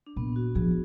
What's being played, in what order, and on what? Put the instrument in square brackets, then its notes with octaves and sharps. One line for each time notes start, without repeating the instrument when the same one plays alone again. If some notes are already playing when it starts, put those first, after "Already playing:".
[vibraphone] D4
[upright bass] A#2 [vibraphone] B3
[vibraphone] F#4
[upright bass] F3 [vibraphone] G#4